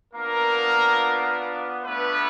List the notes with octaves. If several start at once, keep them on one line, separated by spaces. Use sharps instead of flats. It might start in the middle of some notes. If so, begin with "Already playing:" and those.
A#3 B3 D4 F4 A#4
A3 B3 D4 F4 B4